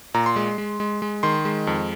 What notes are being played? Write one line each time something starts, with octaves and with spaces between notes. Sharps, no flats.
A#2 A#5
C6
G#3
G#3
G#3
G#3
D#3 C6
G#3
F2